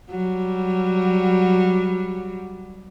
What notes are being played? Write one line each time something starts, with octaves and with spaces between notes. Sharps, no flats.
F#3 G3